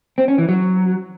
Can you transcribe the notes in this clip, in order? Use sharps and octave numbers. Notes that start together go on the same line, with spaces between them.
C4
C#4
E3
F#3